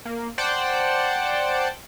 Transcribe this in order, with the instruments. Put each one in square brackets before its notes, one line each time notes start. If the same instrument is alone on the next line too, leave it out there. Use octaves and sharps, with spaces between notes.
[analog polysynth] A#3
C5 D5 F#5 G5 A5